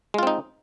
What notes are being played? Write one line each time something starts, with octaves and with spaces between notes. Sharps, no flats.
G#3 C4 D#4 F4